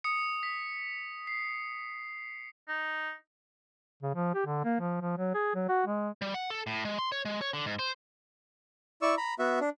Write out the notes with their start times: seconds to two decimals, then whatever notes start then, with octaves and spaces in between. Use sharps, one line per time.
0.04 D#6 C#7
0.43 B6
1.27 C7
2.68 D#4
4.03 C#3
4.15 F3
4.35 G4
4.46 D3
4.65 A#3
4.80 F3
5.01 F3
5.18 F#3
5.34 G#4
5.55 F#3
5.69 F#4
5.87 G#3
6.22 G3
6.34 F#5
6.50 A4
6.67 A2
6.85 G#3
6.98 C6
7.12 C#5
7.25 G#3
7.41 C#5
7.53 D3
7.66 G#2
7.79 C5
9.02 E4 D5 C#6 E6
9.17 A#5 B5
9.39 B3 F#4 E5
9.61 D4